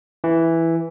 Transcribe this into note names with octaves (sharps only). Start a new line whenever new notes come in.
E3